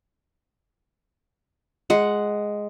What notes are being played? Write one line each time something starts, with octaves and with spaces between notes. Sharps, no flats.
G#3 F#5